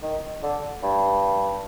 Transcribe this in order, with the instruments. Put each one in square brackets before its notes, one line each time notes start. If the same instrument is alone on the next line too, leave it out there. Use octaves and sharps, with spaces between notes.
[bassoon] D#3
D3
G2